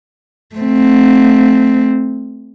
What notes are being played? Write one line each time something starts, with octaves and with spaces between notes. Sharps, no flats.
A3 C4